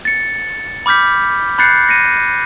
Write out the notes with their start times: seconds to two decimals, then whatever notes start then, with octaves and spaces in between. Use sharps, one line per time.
0.05 A6 C#7
0.86 B5 D6 F6 G6 B6
1.58 B5 F#6 G6 A6 C7 C#7
1.89 A#6 C#7 D#7